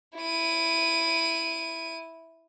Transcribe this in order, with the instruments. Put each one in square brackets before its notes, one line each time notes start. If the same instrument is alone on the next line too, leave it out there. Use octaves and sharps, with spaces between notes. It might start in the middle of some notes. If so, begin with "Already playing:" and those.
[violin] E4 D#7